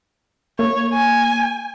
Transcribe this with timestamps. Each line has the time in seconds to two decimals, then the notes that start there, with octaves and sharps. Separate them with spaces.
0.59 A#3 C#5
0.94 G#5